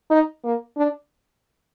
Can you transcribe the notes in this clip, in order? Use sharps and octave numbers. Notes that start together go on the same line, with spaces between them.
D#4
A#3
D4